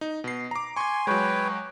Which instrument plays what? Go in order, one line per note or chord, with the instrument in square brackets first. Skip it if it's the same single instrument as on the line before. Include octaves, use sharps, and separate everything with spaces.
[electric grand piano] D#4
B2 C7
A#5 D6
[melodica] G#5 C6 [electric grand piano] C#6 G#6
[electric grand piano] F#3 G#3 [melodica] B4 C#5 G5